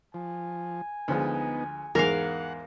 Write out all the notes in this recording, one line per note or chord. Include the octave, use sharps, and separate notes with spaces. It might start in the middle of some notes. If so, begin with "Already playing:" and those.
F3 G#5
D2 F3 G#3 B3 D#4
E2 G#2 G#3 A#4 F5 F#5